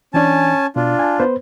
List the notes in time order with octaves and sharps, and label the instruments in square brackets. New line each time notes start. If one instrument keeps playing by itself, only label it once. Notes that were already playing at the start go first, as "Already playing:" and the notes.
[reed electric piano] E3 D4 [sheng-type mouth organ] C#4 G#5 A5
[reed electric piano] B2 [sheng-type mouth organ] D4 F4
[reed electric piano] G#5 A5
B3 B4 C5